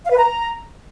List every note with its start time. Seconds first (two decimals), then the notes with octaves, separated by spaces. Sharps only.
0.04 F5
0.11 B4
0.18 A#5